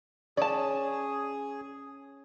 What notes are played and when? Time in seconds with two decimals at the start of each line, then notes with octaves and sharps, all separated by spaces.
0.37 C#4 G#4 D5 A5